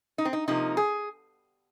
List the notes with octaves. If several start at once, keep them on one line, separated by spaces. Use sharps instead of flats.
D#4
C4
D#4
C3 F3 A#3 D#4
G#4